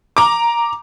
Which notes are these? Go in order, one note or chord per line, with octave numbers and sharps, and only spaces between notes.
A#5 D6